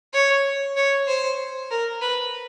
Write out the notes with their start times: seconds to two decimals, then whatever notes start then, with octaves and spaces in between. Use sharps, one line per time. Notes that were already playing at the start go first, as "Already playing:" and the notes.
0.13 C#5
0.76 C#5
1.08 C5
1.71 A#4
2.01 B4